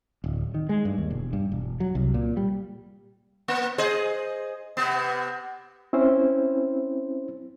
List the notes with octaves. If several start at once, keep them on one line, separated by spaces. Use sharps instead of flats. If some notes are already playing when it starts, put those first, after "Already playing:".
D1
D#3
G#3
G2
D#2
E1
G2
E1
F#3
C2
A#2
G3
A#3
G#4 C5 D#5
C3 B3
C4 C#4 E4 C5